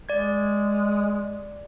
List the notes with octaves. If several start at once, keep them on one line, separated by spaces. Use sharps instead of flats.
G#3 D5 G#6